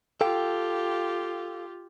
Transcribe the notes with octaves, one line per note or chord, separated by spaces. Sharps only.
F4 G4 A4 F5 G5